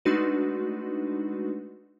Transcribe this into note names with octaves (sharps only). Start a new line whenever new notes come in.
G#3 A3 D4 D#4 F#4 B4